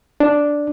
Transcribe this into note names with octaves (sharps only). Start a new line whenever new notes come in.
D4